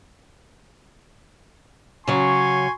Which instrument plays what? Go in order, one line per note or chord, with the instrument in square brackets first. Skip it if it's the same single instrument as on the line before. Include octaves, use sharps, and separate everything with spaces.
[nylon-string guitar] C#3 F#3 [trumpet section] G#5 C6 C#6